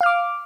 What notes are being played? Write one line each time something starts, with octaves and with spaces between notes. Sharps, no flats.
F5 D6 F6